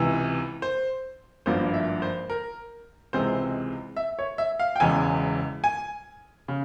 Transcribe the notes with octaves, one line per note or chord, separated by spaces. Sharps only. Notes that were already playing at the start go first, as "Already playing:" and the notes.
Already playing: C#2 C3 E3
C5
G#1 G2 F3 A#3 C5
E5
C5
A#4
C#2 C3 E3 G#3 C4 C5
E5
C#5
E5
F5
G5
E1 E2 C#3 E3 G#3 G#5
G#5
C#3